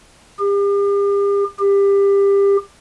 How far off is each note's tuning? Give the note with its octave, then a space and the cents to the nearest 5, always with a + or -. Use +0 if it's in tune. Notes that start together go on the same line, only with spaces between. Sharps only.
G4 +40
G4 +25